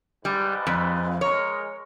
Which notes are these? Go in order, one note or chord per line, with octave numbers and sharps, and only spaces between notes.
G#2 G3 B4
F2
G#3 A#4 C#5